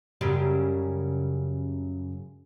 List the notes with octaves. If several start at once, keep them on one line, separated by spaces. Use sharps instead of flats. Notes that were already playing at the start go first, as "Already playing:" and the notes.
F#2 C#3 G3